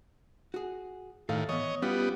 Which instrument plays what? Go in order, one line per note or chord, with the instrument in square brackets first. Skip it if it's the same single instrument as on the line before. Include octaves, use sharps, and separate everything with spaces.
[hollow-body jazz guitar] F#4 G#4
[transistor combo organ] A2 D#3 [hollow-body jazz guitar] A4 F5
[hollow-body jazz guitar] E3 B3 [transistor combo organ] C#5 D#5
[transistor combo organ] G3 B3 [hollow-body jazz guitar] C#4 F4 F#4